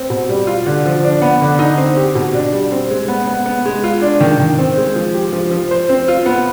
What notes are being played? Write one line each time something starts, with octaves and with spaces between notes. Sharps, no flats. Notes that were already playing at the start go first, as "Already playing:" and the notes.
Already playing: C4
B2
G3
F4
D3
F3
D4
B3
D3
D#4
C4
G4
B2
D4
G3
C4
G#3
B3
B3
B3
G#3
F4
D4
D#3
D#3
C4
G#3
F3
G4
F3
F3
C5
C4
F4
B3